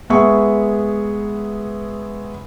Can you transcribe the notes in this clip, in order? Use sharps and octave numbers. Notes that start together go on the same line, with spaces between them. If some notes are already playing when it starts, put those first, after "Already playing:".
G#3 B3 G#4 E5 C#6